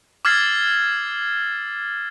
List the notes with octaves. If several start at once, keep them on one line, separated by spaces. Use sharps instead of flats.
D6 E6 F6 G#6 A6 C7